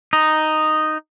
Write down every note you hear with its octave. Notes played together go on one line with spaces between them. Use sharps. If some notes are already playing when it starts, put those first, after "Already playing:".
D#4